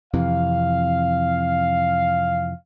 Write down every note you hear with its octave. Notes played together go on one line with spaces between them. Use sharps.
F2 C3 E3 F5